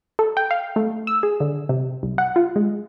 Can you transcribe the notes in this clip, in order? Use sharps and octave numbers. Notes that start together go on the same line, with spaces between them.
A4
G5
F5
A3
E6
G#4
D3
C3
C2
F#5
F4
G#3